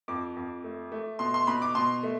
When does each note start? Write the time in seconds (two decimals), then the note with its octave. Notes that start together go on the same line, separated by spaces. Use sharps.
0.08 F2 D6
0.36 F2
0.64 A3
0.92 A3
1.19 B2 C6
1.34 C6
1.47 B2 B5
1.62 D6
1.75 B2 C6
2.03 A3